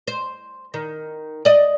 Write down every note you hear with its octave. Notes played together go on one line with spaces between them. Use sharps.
C5
D#3
D5 D#5